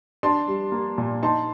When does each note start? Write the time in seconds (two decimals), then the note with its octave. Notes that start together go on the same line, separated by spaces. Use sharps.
0.23 D4 A5 C6
0.48 G3
0.72 A#3
0.98 A#2
1.22 D#4 A5 C6